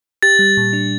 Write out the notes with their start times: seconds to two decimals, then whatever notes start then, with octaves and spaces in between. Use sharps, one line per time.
0.22 G4 A6
0.39 G3
0.57 A#2
0.73 D4